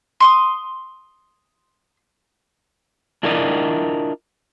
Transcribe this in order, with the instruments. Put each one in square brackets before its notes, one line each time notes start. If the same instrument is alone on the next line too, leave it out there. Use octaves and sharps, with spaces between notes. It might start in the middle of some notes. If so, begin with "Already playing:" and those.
[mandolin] C6 C#6 D#6
[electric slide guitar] D4 E4 F4 A#4 D5 D#5